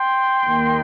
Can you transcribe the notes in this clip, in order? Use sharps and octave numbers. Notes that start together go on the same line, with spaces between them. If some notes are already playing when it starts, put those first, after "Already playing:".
Already playing: G5 C6
D#2 D#3 A#3